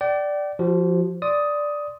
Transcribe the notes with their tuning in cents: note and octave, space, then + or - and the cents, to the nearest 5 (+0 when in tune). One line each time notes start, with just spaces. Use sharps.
D5 +0 G5 -40
F3 +0 F#4 +40
D5 +0 C6 +0 D#6 +10